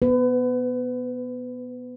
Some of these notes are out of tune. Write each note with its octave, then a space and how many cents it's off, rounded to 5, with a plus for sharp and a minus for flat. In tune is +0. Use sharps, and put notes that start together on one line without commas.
B3 +0 B4 +30